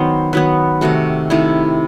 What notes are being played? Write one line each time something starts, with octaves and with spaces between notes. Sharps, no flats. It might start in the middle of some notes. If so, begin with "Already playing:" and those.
Already playing: D#3 F#3 B3 C5
D#3 F#3 B3 B4
C3 D#3 A3 F#4
C3 D#3 A3 E4